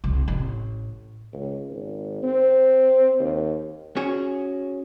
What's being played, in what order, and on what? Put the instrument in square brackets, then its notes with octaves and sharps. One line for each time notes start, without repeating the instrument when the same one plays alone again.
[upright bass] C2
A1
[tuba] C#2
G#1
C4
D#2
[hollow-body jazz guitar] C#4 F#4 G#4